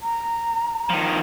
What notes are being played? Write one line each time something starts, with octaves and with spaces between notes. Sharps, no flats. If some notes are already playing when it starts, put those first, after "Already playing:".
A#5
D#3 F3